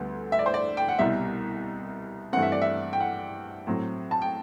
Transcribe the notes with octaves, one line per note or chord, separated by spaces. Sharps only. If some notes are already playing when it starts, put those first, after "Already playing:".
Already playing: D2 D3 G3 B3
E5
D5
C5
D5
G5
F#5
C2 B2 G3 E5
G2 E3 A3 C4 F#5
E5
D5
E5
G5
F#5
A2 F#3 C4
A5
G5